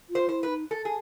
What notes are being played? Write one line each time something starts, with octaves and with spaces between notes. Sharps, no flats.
F4
C5
E4 C5
D#4 B4
A4
G#4